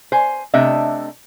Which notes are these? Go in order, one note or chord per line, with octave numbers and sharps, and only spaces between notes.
C5 G#5
C3 A3 D4 D#5 E5